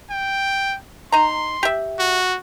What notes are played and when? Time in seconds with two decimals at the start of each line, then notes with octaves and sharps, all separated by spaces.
0.10 G5
1.12 D#4 A#5 C6
1.63 G4 E5
1.99 F#4